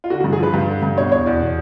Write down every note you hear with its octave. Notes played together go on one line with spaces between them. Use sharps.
F4
D3 F#4
F#4
G2
G#4
F3 B4
G2
D3
G2
B2 C#5
E2 C#5
E2 D5
B2